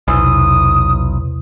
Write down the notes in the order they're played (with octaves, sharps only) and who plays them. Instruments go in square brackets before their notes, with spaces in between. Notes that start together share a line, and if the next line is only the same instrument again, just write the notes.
[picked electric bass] B1 [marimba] E2 C3 E6 [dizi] D#6